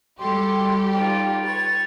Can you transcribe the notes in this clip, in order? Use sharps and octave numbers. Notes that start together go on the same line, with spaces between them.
G3 F#4 G4 A4 C6
D#4 F4 G5
B4 C#5 A6